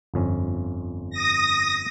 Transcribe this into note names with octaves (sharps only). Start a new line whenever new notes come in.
G1 F2 C#4
D#6 A#6